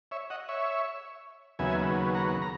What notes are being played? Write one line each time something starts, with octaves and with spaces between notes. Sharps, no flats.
C#5 E5
D#5 F#5
C#5 E5
D#2 C#3 F#3 B3 E5 G#5
F#5 A#5
A#5